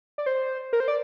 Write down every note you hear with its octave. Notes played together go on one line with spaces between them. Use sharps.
D5
C5
A#4
C5
D5